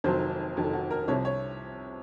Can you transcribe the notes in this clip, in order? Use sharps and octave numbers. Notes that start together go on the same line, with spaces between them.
F1 F2 D#3 F#3 C5
F1 F2 D#3 F#3
A4
F#4
A#4
C2 C3 F3 C#5
C#5